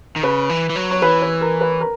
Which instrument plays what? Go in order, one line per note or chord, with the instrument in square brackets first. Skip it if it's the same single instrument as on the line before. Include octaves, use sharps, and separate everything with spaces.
[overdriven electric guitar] D#3
[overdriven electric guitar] C#3 [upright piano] B4
[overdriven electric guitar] E3
E3
F#3
[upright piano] C#5
[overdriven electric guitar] E3 [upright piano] B4
[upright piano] B4
A#4
B4
A#4